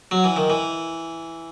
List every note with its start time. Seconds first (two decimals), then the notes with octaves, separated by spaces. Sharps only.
0.11 F#3
0.24 E3
0.36 D#3
0.50 E3